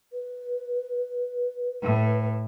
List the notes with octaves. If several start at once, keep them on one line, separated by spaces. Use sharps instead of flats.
B4
A2